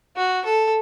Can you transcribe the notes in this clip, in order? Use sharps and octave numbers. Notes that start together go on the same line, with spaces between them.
F#4
A4